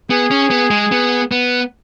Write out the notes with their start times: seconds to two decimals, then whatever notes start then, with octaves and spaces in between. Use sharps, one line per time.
0.10 B3 G#4
0.31 C#4
0.51 B3
0.71 G#3
0.92 B3
1.31 B3